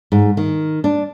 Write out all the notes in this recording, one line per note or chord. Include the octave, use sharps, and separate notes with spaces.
G#2
D#3
D4